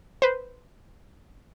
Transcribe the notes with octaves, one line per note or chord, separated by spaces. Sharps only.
B4 C5